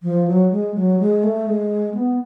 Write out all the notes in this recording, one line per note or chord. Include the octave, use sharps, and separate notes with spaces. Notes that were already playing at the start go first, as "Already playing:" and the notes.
F3
F#3
G#3
F#3
G#3
A3
G#3
B3